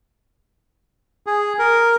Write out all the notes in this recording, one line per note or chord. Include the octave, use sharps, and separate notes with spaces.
G#4
A#4